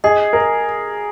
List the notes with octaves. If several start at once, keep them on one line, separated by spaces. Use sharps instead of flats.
G#4 D#5
A#4